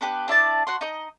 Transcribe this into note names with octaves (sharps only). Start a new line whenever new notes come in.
B3 D4 G4 B4
D4 E4 D5 A5
F#4 F#5 C6
D#4 D#5